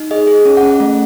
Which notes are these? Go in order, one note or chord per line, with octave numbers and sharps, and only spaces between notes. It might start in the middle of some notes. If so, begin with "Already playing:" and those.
Already playing: D#4
G#4 D#5
G#4
C#4
F#5
C#4
A3